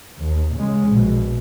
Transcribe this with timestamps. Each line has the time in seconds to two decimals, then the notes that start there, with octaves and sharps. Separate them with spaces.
0.19 D#2
0.55 C#3 G#3
0.88 A#1 B2